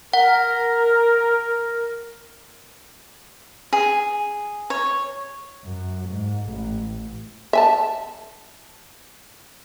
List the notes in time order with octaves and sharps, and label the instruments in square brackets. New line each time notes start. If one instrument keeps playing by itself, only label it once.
[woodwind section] A#4 [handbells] F#5
[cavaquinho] G#4
C#5
[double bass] F#2
G#2
A1
[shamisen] E5 G#5 A5